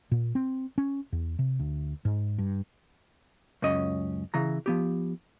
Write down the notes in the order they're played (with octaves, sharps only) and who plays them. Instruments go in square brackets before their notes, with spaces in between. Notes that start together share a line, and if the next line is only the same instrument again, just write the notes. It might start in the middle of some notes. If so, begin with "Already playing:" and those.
[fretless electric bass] A#2
C4
C#4
E2
C3
D2
G#2
G2
[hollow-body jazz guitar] C#2 F#2 C#4 D#5
C#3 E3 A#5
F3 B3 G4